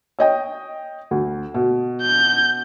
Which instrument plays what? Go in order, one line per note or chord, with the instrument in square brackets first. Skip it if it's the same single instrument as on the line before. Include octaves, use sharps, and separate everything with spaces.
[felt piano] C#5 D#5 G5
D2
B2
[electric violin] G6